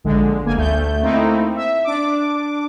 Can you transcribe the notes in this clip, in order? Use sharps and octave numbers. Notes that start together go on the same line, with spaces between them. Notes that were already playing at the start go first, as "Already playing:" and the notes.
A#1 D3 G#3
G1 A#3 G#5
D2 A3 G6
A3 A#3 C4 D#4 E4
E5
D4 D6